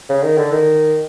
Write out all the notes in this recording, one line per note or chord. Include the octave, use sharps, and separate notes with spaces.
C#3
D#3
D3
D#3